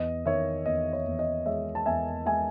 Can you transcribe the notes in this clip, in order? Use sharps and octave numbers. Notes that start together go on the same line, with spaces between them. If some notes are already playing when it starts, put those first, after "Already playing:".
Already playing: E2 D#5
D#3 C#5 E5
E2 D#5
C#5
E2
D#5
G#3 C#5 E5
A5
E2 E5 G#5
G#3 E5 G#5